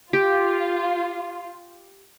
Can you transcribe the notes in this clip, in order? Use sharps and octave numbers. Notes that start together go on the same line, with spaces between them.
F4 G4